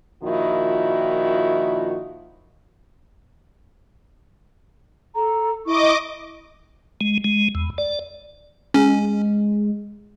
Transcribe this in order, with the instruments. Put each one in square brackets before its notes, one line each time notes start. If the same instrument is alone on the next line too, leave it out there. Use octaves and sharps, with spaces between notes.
[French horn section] A#2 D#3 F3 E4 F#4
[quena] A4 [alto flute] A#5
[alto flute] E4 [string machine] D#5 D6 [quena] C#6
[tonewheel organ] G#3
G#3
E2
D5
[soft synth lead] G#3 [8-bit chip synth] C#4